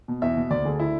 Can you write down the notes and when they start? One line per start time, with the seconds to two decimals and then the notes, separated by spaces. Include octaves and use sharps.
0.08 B2
0.22 E2 E5
0.37 B2
0.50 D2 D5
0.65 D3 G#4
0.80 E4